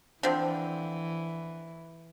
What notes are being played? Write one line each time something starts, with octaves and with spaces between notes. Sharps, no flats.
D3 E3 F3 C4